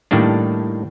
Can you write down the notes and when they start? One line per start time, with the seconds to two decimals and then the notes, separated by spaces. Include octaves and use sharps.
0.11 A2 D#3 G3 A#3 D4